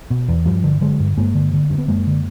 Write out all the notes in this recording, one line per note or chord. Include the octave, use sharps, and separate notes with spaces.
B2
E2
G2 F3 G3
D3
D3 F#3 G#3
G2
G2 G#3 A#3
D3
D3
G2
B3
F#2 G#3 A#3
D3